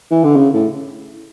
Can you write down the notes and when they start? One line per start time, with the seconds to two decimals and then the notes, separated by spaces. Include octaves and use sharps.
0.11 E3
0.24 D3
0.36 C#3
0.54 A2